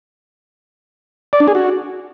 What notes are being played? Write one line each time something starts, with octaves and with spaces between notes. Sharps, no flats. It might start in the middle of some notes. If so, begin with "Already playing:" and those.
D5
D4
G#4
F#4